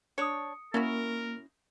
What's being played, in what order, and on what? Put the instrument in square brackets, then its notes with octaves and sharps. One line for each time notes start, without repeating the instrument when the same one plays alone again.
[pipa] D4 C#5 [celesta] D#6 C#7
[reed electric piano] A#3 [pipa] C#4 E4 F#4 [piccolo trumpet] A#4